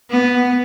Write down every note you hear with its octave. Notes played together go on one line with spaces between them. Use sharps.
B3